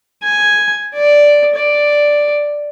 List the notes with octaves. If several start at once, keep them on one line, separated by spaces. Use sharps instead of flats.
G#5
D5
D5